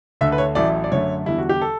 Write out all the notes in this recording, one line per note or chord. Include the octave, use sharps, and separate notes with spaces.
D2 D3 A3 E5
B4
C#5
A1 A2 F#3 A3 D5
D5
F#2 D3 A3 C#5
E2 D3 G3 E4
F#4
G4
A4